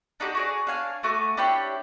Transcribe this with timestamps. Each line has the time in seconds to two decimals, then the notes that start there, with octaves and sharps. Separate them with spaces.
0.20 D4 D#4 F#4 G4
0.35 F#4 G#4 D5
0.67 D4 C#5 F5 G#5
1.03 A3 F#4 G#5 D6
1.37 D4 E4 G4 C#5